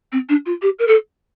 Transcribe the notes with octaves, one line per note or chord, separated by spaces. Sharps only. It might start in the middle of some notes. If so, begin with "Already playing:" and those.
C4
D4
F4
G4
A#4
A4